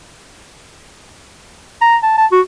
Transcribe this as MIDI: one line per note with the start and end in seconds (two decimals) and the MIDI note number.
1.81 1.96 82
2.03 2.17 81
2.18 2.26 81
2.32 2.41 66